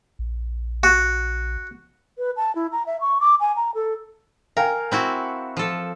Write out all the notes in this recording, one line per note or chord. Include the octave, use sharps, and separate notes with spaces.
A#1
F#4
B4
A5
E4
A#5
E5
C#6
D6
G#5
A#5
A4
A#4 F5 G5 G#5
C4 E4 F#4
F3 A4